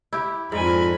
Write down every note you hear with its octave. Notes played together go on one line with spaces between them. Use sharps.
E4 G4
F2 G#2 D5 G#5 B5